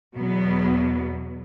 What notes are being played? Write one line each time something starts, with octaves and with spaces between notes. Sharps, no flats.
E2 B2 F#3 B3